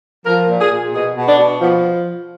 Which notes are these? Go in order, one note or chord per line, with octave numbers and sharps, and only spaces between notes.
F3 A#4
A#2
G#4
A#2
B2 G#4
B2
D4
B2
F3 B3